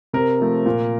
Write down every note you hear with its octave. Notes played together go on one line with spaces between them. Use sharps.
C3 A#4
F3 A3
A#2